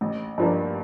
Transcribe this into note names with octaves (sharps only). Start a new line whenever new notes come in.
A1
G2 F3 A#3 D4